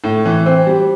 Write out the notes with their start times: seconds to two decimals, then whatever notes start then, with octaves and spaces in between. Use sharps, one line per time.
0.04 A2
0.25 E3
0.46 C4
0.67 G3